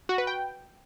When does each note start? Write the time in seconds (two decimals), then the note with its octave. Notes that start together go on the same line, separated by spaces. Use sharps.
0.09 F#4
0.18 B4
0.27 G5